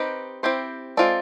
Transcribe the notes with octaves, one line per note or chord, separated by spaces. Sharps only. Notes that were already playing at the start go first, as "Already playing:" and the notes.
Already playing: C4 D#4 G4 B4 D#5
C4 E4 G4 C5
G#3 C4 F4 A4 D5